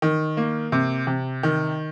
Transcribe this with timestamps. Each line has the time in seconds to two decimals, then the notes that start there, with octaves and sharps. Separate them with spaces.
0.02 D#3
0.37 A#3
0.72 C3
1.07 C3
1.43 D#3